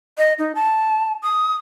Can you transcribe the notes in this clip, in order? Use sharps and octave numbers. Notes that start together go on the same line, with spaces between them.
D#5
D#4
A5
D#6